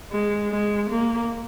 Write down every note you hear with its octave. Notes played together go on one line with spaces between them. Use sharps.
G#3
G#3
A#3